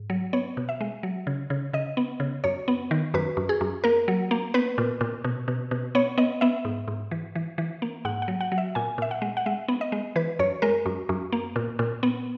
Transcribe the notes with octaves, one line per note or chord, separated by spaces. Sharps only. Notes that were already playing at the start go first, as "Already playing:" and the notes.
Already playing: G#2
F#3
B3 C#5
B2
E5
G#3
F#3
C#3
C#3
C#3 D#5
B3
C#3
F#2 C#5
B3
D#3
F#2 B4
F#2
G#4
F#2
A#3 A#4
F#3
A#3
B3 B4
A#2
A#2
B2
B2
B2
B3 C#5
B3 D#5
B3 E5
G#2
G#2
E3
E3
E3
A#3
G#2 F#5
F#5
F#3
F#5
F#3
E5
A#2 G#5
A#2 E5
F#5
G#3
F#5
G#3 E5
B3
D#5
G#3
E3 B4
F#2 C#5
G#3 A#4
F#2
F#2
A#3
A#2
A#2
B3